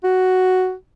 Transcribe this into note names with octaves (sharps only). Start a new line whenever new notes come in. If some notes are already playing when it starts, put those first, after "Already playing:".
F#4